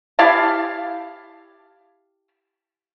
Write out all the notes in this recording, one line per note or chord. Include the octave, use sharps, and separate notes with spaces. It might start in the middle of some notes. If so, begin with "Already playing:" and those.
E4 G4 F5 A5